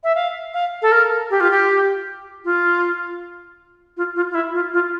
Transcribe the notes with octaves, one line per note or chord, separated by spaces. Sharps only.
E5
F5
F5
A4
A#4
G4
F4
G4
F4
F4
F4
F4
E4
F4
F4